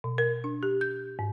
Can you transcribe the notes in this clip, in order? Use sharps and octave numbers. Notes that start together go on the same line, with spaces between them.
B2
A#4
D4
G4
G6
G#2